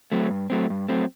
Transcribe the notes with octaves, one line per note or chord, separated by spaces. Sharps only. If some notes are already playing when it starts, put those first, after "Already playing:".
F#3 A3 C4
G2
F#3 A3 C4
G2
F#3 A3 C4